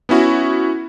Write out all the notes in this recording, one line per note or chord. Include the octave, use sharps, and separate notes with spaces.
B3 C#4 E4 F#4